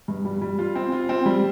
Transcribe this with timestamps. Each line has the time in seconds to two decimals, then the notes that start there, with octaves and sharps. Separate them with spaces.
0.08 G2
0.25 G3
0.42 G3
0.59 F4
0.75 C4
0.92 F4
1.09 C4
1.26 G3